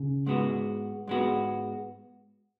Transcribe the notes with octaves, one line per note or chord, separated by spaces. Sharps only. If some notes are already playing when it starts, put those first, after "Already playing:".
Already playing: C#3
G#2 G#3 B3 F#4
G#2 G#3 B3 F#4